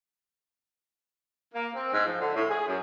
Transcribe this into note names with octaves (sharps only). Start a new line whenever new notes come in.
A#3
C4
G#2
F3
D3
A2
G#4
F#2